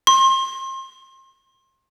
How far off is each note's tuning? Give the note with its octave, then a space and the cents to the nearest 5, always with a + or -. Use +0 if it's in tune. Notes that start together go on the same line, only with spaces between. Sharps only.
C6 +35